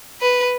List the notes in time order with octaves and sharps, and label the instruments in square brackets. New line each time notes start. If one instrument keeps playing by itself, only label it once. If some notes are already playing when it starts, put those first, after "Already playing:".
[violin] B4